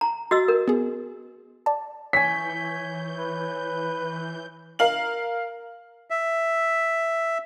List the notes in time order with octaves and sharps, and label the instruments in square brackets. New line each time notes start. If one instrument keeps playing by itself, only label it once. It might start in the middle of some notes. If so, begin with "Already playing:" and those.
[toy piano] A#5
[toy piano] F#4 D#5 E6 [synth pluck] C6
[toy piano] A#4
[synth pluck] B3 G#4
D5 A5
[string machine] E3 G6 [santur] C#5 G#5 [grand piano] B6
[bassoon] B4
[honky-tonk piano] A#4 F5 F#7
[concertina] E5